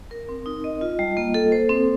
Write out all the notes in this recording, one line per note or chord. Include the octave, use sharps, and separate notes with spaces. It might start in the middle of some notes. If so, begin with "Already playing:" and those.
A#4
C4
D#4
D#5
F4
G3
A#3
A4
C5
C4